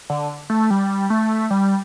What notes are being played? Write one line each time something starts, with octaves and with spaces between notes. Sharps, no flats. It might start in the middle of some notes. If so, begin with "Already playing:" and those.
D3
A3
G3
A3
G3